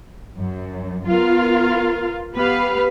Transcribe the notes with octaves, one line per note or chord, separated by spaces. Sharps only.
F#2
B3 F4 A#4 F5
B3 G4 B4 F5